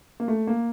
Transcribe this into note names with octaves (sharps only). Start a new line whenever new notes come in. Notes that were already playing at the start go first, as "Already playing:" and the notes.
A#3
A3
A#3